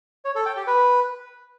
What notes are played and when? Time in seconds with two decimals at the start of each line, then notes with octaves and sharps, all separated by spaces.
0.25 C#5
0.35 A4
0.46 G5
0.56 G4
0.67 B4